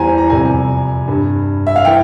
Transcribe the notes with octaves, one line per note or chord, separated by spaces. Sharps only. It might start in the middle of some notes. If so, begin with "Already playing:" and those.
Already playing: E2 E3 G3 C5 G#5 A#5
A#5
F2 C3 G3 G#5
G2 G3
E5
F5
E3 G5